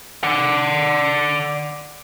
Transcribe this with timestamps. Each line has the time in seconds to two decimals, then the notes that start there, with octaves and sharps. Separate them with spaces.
0.23 D5 F#5